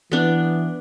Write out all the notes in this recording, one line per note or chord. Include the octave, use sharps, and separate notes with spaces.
E3 B3 D4